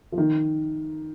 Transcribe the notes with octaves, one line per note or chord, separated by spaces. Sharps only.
F3
D#3